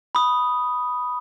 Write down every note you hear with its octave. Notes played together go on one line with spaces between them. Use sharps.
B5 D#6